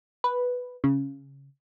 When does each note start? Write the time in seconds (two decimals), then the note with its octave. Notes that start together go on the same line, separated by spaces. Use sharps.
0.24 B4
0.84 C#3